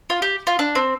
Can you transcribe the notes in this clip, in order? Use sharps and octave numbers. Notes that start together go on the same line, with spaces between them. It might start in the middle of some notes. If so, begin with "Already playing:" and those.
F4
G4
F4
D4
C4